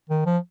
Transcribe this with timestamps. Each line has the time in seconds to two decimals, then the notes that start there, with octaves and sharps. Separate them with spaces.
0.09 D#3
0.26 F3